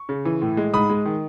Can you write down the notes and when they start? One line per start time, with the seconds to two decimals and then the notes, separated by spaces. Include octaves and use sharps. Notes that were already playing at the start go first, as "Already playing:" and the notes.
Already playing: C#6
0.09 C#3
0.25 E3
0.42 A2
0.57 G#3
0.74 G#2 B5 D#6
0.90 G#3
1.05 D#3